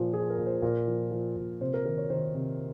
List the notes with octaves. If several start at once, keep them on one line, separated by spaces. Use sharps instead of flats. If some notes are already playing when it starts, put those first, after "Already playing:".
Already playing: A#2 F3
F3 G#4
A#4
A#2
C5
A#2 A#4
F3
F3
A#2
C3 C5
A#4
D#3 A#4
C#5
D#3 C5
C3